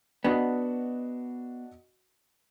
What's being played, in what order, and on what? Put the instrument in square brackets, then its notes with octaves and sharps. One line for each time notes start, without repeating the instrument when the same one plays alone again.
[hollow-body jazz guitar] B3 [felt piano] D4 F#4 D#5